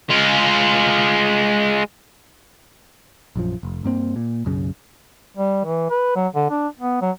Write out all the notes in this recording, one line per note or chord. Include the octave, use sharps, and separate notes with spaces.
G#3 F4
A#1 F#2 F3
F1
G2 A#3 C4
A#2
B1 F#2 C#3
G3
E3
B4
F#3
D3
D4
B3
F#3